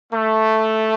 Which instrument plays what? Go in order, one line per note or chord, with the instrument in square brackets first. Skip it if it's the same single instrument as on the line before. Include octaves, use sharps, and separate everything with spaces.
[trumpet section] A3